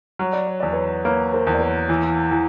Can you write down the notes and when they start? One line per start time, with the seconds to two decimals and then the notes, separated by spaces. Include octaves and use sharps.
0.19 F#3 C#5
0.33 D5
0.47 C#5
0.60 E2 D5
0.72 B4 C#5
1.04 A#3 B4 C#5
1.33 A#4 C5
1.47 E2
1.54 D5
1.60 B4 C#5
1.89 E3
2.31 E3